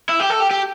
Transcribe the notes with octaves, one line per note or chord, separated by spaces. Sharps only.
E4
G4
A4
G4
G4